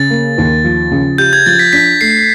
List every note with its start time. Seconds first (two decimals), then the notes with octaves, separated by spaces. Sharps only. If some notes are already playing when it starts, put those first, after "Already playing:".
Already playing: C#3 A6
0.10 A#3
0.38 D#2
0.64 F3
0.91 C#3
1.18 G4 G6
1.33 G#6
1.46 F3 A6
1.59 B6
1.73 D4 B6
2.01 A3 C7